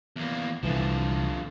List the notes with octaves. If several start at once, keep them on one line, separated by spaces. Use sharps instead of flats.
E2 A#3
C2 D3 E3 F3